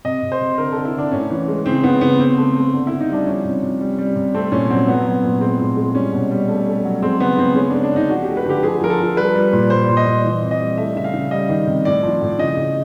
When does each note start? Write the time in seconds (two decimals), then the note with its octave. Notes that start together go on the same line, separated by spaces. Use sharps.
0.05 C3 D#5
0.23 C3
0.32 C5
0.40 C3
0.58 D3 A#4
0.72 D3 A4
0.85 E4
0.95 D3 D4
1.12 A2 C#4
1.30 E3
1.48 G#3
1.66 C#3 C4
1.83 C#3 B3
2.01 C#3 B3
2.19 C#3 C4
2.38 A3
2.55 A3
2.73 D3
2.87 D3 E4
3.00 D#4
3.09 G3 D4
3.27 F3 C#4
3.44 C3
3.62 C3
3.81 G3
3.98 G3
4.16 C3
4.34 A3 C4
4.52 A#2 C#4
4.70 F#3 C4
4.88 F#3 B3
5.06 F#3
5.23 A#2
5.41 G#3 C4
5.59 A2
5.77 G#3
5.95 G3 C#4
6.13 B2
6.31 G3
6.49 A3
6.66 A3
6.85 F#3
7.02 G#3 C4
7.20 C#3 B3
7.38 C#3 C4
7.55 G#3 C#4
7.69 G#3 D4
7.83 D4
7.92 D3 D#4
8.09 F3 F#4
8.23 G4
8.28 A3
8.37 B4
8.45 D3 G4
8.63 F3 G#4
8.81 F3 A#4
8.90 A4
8.98 F3
9.17 G3 B4
9.35 G3
9.53 A#2
9.70 G3 C5
9.88 A#2
9.97 D#5
10.06 A#2
10.24 E3
10.42 C3
10.51 D#5
10.60 G3
10.78 A3 E5
10.95 C#3 E5
11.04 F5
11.14 C#3
11.31 G3 D#5
11.49 D#3
11.67 C3
11.85 A2 D5
12.03 F3
12.21 A2
12.39 C#3 D#5
12.57 C#3